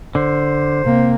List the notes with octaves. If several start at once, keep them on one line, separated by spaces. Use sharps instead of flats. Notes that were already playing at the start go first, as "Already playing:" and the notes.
D3 C5
C3 A#3